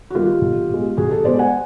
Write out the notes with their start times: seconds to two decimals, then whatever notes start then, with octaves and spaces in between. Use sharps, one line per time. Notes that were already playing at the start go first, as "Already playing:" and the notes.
0.10 F#4
0.15 D#3 G3 A#3 F4 G4
0.41 B1
0.69 B2 G#3
0.97 B1 F#4 G#4
1.11 G4 A4
1.24 B2 G#3 C5 D5
1.39 F#5 G#5